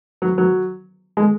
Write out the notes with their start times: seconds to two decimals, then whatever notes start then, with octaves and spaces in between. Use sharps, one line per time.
0.22 F#3
0.38 F#3
1.17 G#3